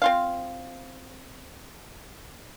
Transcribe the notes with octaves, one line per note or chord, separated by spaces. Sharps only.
C4 F4 F5